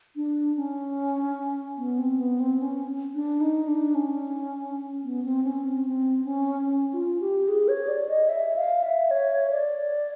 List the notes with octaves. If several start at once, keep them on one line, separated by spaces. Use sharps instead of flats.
D4
C#4
B3
C4
B3
C4
C#4
D4
D#4
D4
C#4
B3
C4
C#4
C4
C4
C#4
C#4
F4
G4
G#4
C#5
D5
D#5
E5
F5
E5
C#5
D5